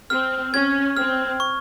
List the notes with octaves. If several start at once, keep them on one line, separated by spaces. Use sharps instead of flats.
C4 F6
C#4 G#6
C4 F6
C#6